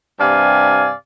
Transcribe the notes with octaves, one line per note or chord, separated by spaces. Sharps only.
G2 C3 D5 F5 G#5